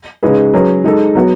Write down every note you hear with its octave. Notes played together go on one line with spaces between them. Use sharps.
C#3 G#3 D#4 G#4 B4
F#3 C#4 G#4 B4
G#3 D#4 A4
F#3 B3 F#4